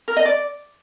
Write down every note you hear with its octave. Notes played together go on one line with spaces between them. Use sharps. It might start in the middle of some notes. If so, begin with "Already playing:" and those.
A#4
D#5
D5